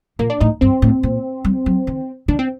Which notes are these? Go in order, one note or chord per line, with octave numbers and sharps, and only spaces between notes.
A#2 A#3
D4
A2 D#4
G2 C4
A2
A#2
G3
F#3
D#3
D#3 D4
C4